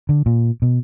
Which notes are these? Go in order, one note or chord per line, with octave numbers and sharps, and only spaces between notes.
D3
A#2
B2